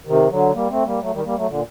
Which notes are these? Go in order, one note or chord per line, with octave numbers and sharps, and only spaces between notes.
C3 D#3
D3 F#3
G3 A#3
A3 C4
G3 A#3
F#3 A3
D#3 G3
G3 A#3
F#3 A3
A#2 D3